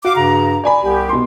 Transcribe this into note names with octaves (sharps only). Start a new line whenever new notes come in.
F#4 F5 D6
G2 C#3 A#5
D5 G#5 B5
C2 B3 G4
B2 C6